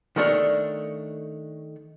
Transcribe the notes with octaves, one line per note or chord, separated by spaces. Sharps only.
D#3 A3 D4 C#5